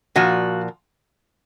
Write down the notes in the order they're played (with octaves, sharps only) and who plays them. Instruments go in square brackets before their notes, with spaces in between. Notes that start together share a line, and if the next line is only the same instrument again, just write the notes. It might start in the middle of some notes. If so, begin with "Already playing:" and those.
[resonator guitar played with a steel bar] A#2 F3 F#4